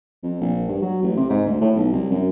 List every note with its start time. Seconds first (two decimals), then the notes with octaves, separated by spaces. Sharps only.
0.23 F2
0.41 A#1
0.68 G2
0.82 F#3
1.03 A1
1.17 C3
1.30 G#2
1.46 D2
1.61 A2
1.75 B1
1.93 C2
2.11 F#2